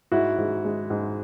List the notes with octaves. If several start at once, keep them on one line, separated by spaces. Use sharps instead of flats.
G#2 E4 F#4
G#2
G#3
G#2